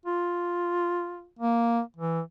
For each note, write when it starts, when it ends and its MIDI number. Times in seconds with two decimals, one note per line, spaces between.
0.06 1.27 65
1.39 1.80 58
1.96 2.20 52